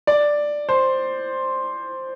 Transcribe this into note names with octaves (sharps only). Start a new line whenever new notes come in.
D5
C5